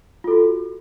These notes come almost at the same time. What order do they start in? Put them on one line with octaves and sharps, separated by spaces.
F4 A4 F#4